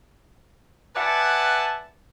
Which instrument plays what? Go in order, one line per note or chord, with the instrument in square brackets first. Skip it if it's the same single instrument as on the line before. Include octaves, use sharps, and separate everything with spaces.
[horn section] B4 D5 E5 F#5 G#5 A5